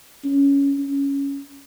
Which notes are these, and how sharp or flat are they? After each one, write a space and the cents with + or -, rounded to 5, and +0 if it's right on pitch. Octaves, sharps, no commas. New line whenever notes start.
C#4 +10
C#4 +5